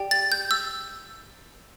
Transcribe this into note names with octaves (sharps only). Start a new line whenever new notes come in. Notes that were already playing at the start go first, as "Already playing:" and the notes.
Already playing: G4 D5 G5
A6
G6
E6